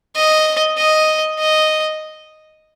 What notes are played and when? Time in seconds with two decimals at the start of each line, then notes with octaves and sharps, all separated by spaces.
0.16 D#5
0.77 D#5
1.39 D#5